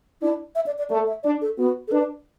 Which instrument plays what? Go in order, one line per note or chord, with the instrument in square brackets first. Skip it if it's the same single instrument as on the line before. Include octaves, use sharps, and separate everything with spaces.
[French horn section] D4 [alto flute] E4
[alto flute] E5
D5
D5
[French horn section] A3 [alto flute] D5
[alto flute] E5
[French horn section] D4 [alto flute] D5
[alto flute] A4
[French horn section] B3 [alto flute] F#4
[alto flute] A4
[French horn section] D4 [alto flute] B4